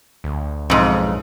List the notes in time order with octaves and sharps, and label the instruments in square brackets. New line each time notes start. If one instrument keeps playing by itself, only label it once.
[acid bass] D2
[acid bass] B1 [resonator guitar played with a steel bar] F2 G#2